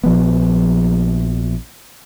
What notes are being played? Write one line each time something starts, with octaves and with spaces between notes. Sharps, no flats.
A#1 F3 B3